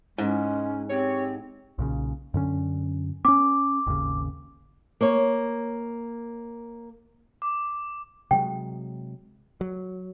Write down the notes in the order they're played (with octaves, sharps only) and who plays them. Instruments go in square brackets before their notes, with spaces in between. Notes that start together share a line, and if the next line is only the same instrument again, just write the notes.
[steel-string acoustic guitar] G#2 [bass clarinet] G#3 [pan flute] C#4
[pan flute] C4 [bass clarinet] G4 [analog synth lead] C#5
[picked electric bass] B1 A#2 C#3
F#2 D3 C#4
[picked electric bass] C4 C#4 [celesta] D6
[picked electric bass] G#1 D#2 C#3
[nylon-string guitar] A#3 C#5
[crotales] D6
[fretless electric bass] C3 F#3 G#3 [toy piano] G5
[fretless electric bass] F#3